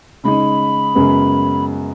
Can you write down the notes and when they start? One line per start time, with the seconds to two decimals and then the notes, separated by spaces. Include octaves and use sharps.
0.24 C#3 G#3 D#4 B5
0.95 F#2 C#3 G#3 B3